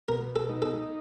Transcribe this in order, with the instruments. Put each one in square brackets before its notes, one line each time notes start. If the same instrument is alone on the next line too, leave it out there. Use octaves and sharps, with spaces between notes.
[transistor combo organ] B2 [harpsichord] A#4
[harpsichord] A4
[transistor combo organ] D#4
[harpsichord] A4